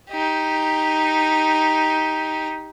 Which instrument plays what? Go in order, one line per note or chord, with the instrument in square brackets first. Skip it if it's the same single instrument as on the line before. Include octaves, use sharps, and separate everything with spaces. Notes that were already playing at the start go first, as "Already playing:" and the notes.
[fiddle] D#4 G4